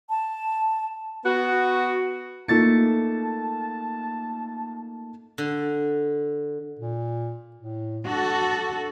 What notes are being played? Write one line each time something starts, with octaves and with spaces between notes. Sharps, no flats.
A5
B3 F#4
A3 A#3 D#4 F4 A5 A6 C#7
D3
A#2
A2
D4 F#4 A4